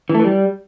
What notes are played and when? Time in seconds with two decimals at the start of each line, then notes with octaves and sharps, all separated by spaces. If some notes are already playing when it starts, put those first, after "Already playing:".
0.09 E3
0.15 A3
0.20 E3
0.25 G3